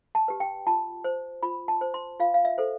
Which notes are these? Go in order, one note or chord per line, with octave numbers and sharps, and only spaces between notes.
A5
G4 B4
G5
F4 A5
C5
F4 B5
A5
C5
C6
F4 F5
F5
E5
A4 C5